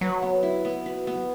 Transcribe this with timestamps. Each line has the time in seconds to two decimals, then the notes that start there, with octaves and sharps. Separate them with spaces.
0.01 F#3 B4
0.22 B3
0.43 E4
0.65 B3
0.86 B4
1.07 B3